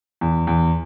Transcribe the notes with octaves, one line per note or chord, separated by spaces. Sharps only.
E2
E2